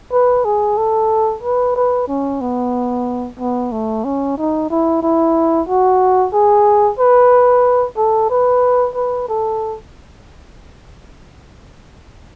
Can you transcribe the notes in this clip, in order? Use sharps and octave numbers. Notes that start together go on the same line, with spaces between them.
B4
G#4
A4
B4
B4
C#4
B3
B3
A3
C#4
D#4
E4
E4
F#4
G#4
B4
A4
B4
B4
A4